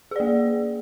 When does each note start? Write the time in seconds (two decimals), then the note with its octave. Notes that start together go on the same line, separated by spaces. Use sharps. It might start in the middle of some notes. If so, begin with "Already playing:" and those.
0.11 G#4
0.16 D5
0.20 A#3